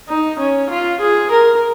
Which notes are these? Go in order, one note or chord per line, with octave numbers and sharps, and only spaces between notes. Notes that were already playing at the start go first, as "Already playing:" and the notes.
D#4
C#4
F4
G#4
A#4